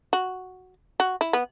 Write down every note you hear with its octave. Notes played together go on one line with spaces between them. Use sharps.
F#4
F#4
E4
B3